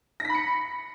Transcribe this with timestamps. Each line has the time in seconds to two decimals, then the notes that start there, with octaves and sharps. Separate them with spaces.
0.20 A#6
0.25 B6
0.30 B5
0.35 C#7